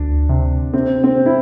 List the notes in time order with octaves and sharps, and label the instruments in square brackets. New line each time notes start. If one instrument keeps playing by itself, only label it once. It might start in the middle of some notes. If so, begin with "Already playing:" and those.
Already playing: [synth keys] D2 [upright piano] D4
[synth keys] C3
[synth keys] C3 [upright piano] C4
[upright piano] C4
[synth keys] C3
[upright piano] E4